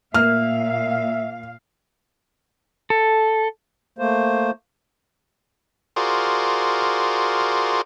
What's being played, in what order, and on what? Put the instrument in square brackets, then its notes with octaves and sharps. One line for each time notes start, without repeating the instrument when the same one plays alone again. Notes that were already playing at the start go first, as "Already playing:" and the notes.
[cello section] A#2 F5 [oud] A#3 [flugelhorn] E5 [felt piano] F6
[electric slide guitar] A4
[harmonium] A3 A#3 C5
[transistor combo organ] F4 F#4 G#4 A#4 C5 D5